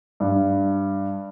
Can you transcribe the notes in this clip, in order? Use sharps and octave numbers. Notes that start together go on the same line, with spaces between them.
G2